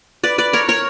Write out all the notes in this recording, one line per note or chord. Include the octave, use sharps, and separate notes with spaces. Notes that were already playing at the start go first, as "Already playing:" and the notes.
B4 D5
B4 D5
A#4 C#5
A#4 C#5